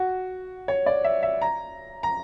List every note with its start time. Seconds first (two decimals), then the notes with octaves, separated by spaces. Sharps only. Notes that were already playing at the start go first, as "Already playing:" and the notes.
Already playing: F#4
0.68 C#5
0.86 D5
1.04 E5
1.23 E5
1.42 A#5
2.03 A#5